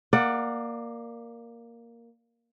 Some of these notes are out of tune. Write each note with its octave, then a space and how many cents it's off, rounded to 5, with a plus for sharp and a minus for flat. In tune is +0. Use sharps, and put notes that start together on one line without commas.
A#3 +0 D5 +20 F#5 +0